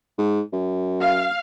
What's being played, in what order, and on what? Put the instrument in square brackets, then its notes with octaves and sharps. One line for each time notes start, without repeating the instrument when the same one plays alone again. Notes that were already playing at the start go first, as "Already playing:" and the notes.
[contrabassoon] G#2
F#2
[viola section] F5